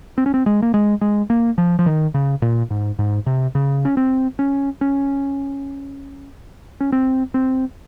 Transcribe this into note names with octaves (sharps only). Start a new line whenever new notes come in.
C4
C#4
C4
G#3
A#3
G#3
G#3
A#3
F3
F3
D#3
C#3
A#2
G#2
G#2
C3
C#3
C#4
C4
C#4
C#4
C#4
C4
C4